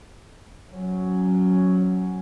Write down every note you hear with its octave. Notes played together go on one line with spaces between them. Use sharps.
F#3 C#4